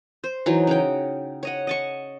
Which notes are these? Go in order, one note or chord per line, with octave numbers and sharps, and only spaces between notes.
C5
E3 F#3 D#4
C#3 F#4 G5
C#5 D#5 F#5
D#5 A5 C#6